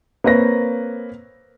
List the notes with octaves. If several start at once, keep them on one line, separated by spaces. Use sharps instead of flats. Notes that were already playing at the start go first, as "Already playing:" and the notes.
A#3 C4 B4 C#5 A#6